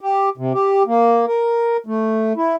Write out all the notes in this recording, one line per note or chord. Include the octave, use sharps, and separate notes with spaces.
G4
C3
G4
A#3
A#4
A3
E4